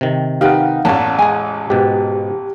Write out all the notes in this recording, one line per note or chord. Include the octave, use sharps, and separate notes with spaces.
C3 D#3
D#4 G4 A#4 B4 F5 F#5
A1 E2 A#3 C#4 D5 A5
G#3 G#4 G#5
G#2 B2 G4